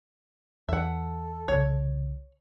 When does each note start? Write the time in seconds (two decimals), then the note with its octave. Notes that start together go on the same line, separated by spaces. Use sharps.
0.69 E2 A4 E5 F#5
1.48 C2 C#3 C#5